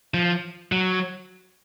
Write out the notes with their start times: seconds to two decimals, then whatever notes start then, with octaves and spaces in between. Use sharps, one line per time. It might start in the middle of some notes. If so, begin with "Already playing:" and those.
0.14 F3
0.72 F#3